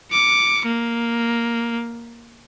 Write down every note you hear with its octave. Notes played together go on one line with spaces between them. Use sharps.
D6 C#7
A#3